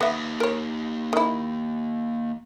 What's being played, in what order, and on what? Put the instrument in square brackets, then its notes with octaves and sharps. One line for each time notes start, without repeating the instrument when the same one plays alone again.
[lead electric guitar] D#2 [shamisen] B3 E5
[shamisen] A#4 C#5
D#3 E4